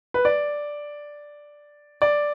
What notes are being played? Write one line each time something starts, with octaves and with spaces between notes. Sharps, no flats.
B4
D5
D5